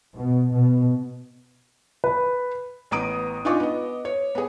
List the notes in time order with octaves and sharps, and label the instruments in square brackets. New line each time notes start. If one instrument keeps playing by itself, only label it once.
[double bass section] B2
B2
[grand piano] B4
[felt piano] A1 B3 A#5 D#6 D7
D4 D#4 F4 G#5 C#6 D6
B3 D#5
C#5
B3 G#4